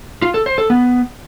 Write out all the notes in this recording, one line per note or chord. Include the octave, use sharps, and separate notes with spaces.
F4
A4
C5
A4
B3